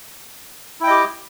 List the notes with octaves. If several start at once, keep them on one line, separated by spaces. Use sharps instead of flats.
E4 G4 D#5 G5